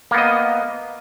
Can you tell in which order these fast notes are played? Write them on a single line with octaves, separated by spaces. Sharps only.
A#3 B3 D#5